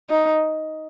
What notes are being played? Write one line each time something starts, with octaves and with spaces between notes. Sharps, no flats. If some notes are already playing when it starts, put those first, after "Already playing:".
D#4